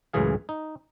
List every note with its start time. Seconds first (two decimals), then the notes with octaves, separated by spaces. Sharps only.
0.13 C#2 F#2 A2 E3 G#4 F5
0.49 D#4